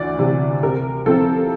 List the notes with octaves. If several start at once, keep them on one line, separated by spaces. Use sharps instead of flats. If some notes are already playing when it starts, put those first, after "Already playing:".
Already playing: D2 E3 D5
C3 E3
C3 A#4
F3 C4 E4 A4